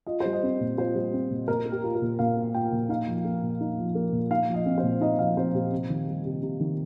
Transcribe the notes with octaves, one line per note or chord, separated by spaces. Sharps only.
F4 D#5
G3 C5
D#5
C4
A#2
F4 C5
G3
C4
A#2
A#2 A#4
A#3
G4
F4
A#4
A#2
A#2 F5
A#3
F4 G5
A#2
D#4 F5
F3
A#3
A#2
D#4
F3
A#3
A#2
D#4 F5
F3
D#5
C4
C5
A#2
D#4 D#5
F3 F5
C4 C5
A#2 G4
C3
D#3
G3
C3
C3
D#3